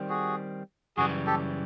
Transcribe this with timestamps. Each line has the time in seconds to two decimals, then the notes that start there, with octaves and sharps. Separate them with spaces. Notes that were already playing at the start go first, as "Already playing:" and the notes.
Already playing: D#3 G3 C4
0.09 F#4 G#4
0.97 F#2 C#3 E3 G3 F#4 G#4
1.26 G4 A4